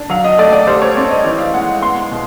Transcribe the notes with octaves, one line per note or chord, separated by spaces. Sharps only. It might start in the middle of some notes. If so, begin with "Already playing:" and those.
Already playing: D4
F#3 F5
D#5
A3 D5
D5
G3 C5
C#5
C4 D5
D#5
E3 D#5
F5
G#3 F#5
B3 C6
B2